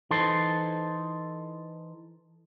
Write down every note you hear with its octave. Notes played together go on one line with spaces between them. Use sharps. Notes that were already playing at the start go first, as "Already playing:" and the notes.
E3 D#4 A4 C5